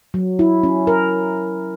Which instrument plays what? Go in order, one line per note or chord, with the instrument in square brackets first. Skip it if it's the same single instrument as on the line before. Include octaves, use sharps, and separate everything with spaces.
[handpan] F#3
E4
C#4
A#4